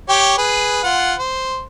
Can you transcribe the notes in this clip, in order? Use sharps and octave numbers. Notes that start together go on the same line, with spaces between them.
G4 C#5 G5
G#4 B4
F4 F#5
C5